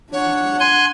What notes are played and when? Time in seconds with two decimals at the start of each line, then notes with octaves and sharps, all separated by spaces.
0.12 D4 C#5 F#5
0.60 G#5 C6 F#6 G#6